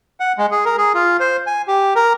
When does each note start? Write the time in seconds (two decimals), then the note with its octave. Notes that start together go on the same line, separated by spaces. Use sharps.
0.20 F#5
0.38 G#3
0.51 G#4
0.65 A#4
0.78 G#4
0.94 F4
1.20 C5
1.47 G#5
1.68 G4
1.96 A#4